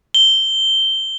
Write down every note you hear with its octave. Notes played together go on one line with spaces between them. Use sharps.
G7